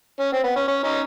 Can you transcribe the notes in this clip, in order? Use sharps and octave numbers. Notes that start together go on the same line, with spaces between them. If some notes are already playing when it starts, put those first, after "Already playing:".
C#4
C4
B3
C#4
C#4
C#4 D#4